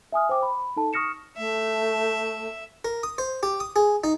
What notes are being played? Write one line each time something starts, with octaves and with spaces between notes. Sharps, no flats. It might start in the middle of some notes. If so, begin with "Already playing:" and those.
E5 G#5 D#6 F6
C5 G5 D6
B5
D#4 A4 A5
C#6 D#6 F6 A#6 C#7 E7
A3 E5
A#4
D#6
C5
G4
D#6
G#4
D#4